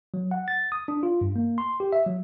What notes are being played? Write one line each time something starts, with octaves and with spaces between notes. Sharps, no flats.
F#3
F#5
A6
D#6
D4
F4
G2
A#3
C6
G4
E5
F#3